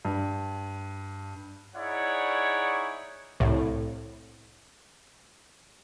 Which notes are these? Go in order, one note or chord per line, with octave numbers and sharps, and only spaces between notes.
G2
D#4 E4 G#4 C#5 D5 F#5
C2 A2